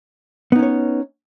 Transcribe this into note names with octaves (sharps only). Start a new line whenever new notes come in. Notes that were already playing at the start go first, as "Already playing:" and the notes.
B3 C#4 D#4 C#5